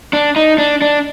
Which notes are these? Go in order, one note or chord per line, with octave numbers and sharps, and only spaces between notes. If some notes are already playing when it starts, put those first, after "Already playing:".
D4
D#4
D4
D4